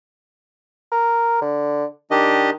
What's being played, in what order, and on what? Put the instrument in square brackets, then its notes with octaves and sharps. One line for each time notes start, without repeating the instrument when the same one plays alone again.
[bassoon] A#4
D3
[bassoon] D#3 [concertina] D4 G4 D#5